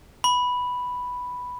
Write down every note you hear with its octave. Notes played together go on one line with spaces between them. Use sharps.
B5